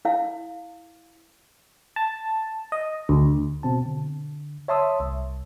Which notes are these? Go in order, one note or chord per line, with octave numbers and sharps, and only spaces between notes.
E4 F5
A5
D#5
D2
B2 C4 A5
D3
C#5 E5 A5 C6 D#6 E6
C2